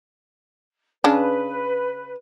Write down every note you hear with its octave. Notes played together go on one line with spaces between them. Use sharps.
C#3 D4 B4